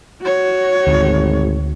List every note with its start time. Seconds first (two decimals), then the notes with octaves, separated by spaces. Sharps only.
0.21 F#4 C#5
0.87 G#1 D2